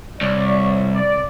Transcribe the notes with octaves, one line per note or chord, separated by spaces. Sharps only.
C2 C#5 D5
D5